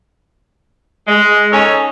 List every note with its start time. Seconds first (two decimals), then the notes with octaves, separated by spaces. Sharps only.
1.06 G#3
1.51 C#4 D#4 A4 C#5